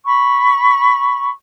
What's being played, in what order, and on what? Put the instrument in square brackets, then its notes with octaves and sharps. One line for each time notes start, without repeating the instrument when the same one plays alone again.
[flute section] B5 C#6